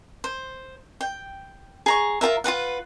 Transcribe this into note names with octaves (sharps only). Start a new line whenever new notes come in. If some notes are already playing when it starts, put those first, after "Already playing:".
C5
G5
G#4 A#5 C#6
F4 G4 A#4 E5
F4 F#4 B4 F#5